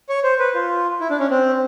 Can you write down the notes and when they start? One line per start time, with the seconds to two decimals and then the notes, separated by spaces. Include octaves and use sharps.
0.09 C#5
0.24 C5
0.39 B4
0.55 F4
1.01 E4
1.10 D4
1.20 C#4
1.30 C4